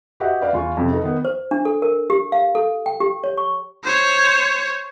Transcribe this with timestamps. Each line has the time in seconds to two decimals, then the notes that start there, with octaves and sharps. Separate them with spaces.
0.20 F#4 G4 B4 D#5 E5 F#5
0.41 B4 D5 F5
0.53 E2 F4 C#6
0.77 F2 C3
0.92 D#4 A4 B4
1.04 D#3 B3
1.25 C5
1.51 D4
1.65 A4
1.82 A#4
2.10 G4
2.32 F5
2.55 A4
2.86 G5
3.00 G4
3.24 C#5
3.37 C#6
3.84 C5 C#5